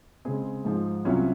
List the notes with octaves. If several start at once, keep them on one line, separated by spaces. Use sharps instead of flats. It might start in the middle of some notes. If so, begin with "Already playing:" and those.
C#3 G#3 C4 G#4
G#2 F3 G#3
C2 C3 F#3 C#4 F4